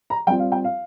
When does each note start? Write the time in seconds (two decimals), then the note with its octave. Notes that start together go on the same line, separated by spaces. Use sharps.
0.10 A#5
0.27 G3 C4 F4 G5
0.39 F5
0.52 G5
0.64 F5